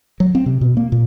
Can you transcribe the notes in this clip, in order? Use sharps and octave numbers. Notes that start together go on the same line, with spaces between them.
F#3
C4
C3
B2
A#3
A#2